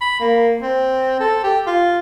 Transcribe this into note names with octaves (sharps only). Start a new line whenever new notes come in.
B5
A#3
C4
A4
G4
F4